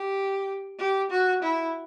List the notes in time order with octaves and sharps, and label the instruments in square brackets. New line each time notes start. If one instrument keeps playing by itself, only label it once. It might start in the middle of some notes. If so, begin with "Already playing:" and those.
Already playing: [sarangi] G4
G4
F#4
E4